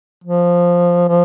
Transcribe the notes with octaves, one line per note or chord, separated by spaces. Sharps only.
F3
F3